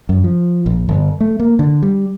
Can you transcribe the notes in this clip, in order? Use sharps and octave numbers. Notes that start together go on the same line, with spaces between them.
F#2
F3
A#1
G1
A3
A#3
D3
G3